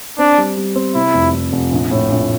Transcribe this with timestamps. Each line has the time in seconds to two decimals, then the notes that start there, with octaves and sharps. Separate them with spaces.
0.19 C4 D4
0.38 G3
0.57 G3
0.76 C4
0.95 C3 E4
1.14 F1
1.34 F1
1.53 F1
1.72 A#1
1.91 A2
2.10 A#1